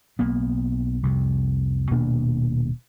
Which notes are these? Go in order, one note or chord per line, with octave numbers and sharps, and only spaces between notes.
B1 A#3 B3
C2 F2 C3
D#1 B2 A#3 D4